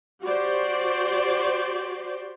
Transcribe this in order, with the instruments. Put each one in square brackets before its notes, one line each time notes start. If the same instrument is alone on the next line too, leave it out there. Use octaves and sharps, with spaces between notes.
[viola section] F#4 G4 C5 D5